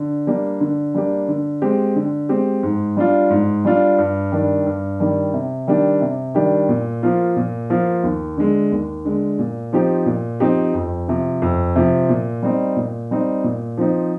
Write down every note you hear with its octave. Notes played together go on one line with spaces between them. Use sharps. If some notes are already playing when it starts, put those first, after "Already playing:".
Already playing: D3
G3 A#3 D4 G4
D3
G3 A#3 D4 G4
D3
G#3 C4 G4
D3
G#3 C4 G4
G#2
G3 D4 F4
G#2
G3 D4 F4
G2
D#3 G3 D4
G2
D#3 G3 D4
C3
D#3 G3 D4 G4
C3
D#3 G3 D4 G4
A#2
F3 A#3 F4
A#2
F3 A#3 F4
D#2
D3 G#3
D#2
D3 G#3
A#2
F3 C4 D#4 G4
A#2
F3 C4 D#4 G4
F2
C3 F3
F2
C3 F3
A#2
G3 C4 D#4
A#2
G3 C4 D#4
A#2
F3 C4 D#4